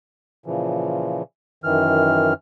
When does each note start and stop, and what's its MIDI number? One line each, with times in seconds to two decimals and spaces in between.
0.46 1.23 46
0.46 1.23 49
0.46 1.23 52
0.46 1.23 53
1.64 2.33 42
1.64 2.33 51
1.64 2.33 52
1.64 2.33 89